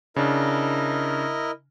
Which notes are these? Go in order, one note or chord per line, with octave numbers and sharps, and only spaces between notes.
C#3 D4 E4 A#4 D#5